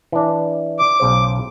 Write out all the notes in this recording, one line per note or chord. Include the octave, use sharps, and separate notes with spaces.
E3 D4
D6
B1 C#3 C5